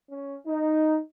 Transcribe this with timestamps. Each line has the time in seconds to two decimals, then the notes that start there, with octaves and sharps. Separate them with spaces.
0.10 C#4
0.46 D#4